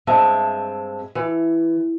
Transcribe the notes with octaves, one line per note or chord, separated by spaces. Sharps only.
G2 G#3 C4 E5 A5
E3